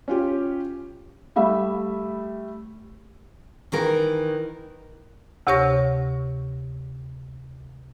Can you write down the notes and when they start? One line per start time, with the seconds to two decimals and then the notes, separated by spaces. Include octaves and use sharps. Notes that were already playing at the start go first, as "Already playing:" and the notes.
0.08 C#4 F4 G4
1.36 G3 A3 E5 B5
3.72 D#3 E3 A#4
5.47 D2 C3 G4 C#5 C#6 A#6